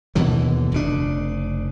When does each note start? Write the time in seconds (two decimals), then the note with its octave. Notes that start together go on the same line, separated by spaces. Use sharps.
0.15 D#2 B2 D3 E3
0.72 F1 C#3 D4